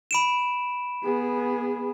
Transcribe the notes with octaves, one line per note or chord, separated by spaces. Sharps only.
B5 D7 E7
B3 G#4